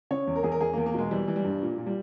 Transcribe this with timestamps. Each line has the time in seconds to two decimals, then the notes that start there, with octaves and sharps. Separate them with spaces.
0.11 C#3 C#5
0.27 E2
0.36 A#4
0.43 E2 G#4
0.52 A#4
0.61 E2 G#4
0.73 A#3
0.77 E2
0.86 A#3
0.94 B2 G#3
1.11 E3 G3
1.28 E3
1.36 G3
1.44 G2
1.62 A#2
1.78 A#2
1.86 G3